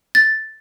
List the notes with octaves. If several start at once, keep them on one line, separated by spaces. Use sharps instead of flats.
A6